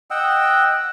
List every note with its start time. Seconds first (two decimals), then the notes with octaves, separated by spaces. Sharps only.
0.11 D#5 F#5 G5 E6